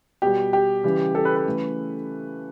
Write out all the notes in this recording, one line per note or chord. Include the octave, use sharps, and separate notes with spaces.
B2 G3 G4
G4
C#3 E3 G3
A4
B4
B4
C#3 E3 A3